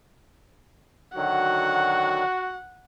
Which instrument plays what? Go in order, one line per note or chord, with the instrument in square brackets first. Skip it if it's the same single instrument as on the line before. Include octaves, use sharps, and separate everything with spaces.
[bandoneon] D3 D#3 F#3 [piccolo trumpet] F#4 [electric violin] F#5